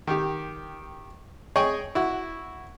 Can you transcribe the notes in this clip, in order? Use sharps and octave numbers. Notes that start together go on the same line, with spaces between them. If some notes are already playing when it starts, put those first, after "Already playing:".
D#3 G4
G#4 C#5 D#5 G5 G#5 C#6
E4 F#4